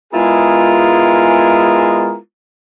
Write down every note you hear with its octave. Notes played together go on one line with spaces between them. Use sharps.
G#3 B3 E4 F4 G#4 A#4